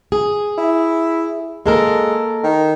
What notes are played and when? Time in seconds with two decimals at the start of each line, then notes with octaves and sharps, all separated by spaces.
0.12 G#4
0.58 E4
1.66 G#3 A#3 A4 A#4
2.44 D#3